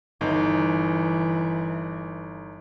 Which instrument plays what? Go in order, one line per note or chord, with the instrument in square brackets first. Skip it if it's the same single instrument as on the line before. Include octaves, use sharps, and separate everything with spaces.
[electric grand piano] G1 D#4 [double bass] E3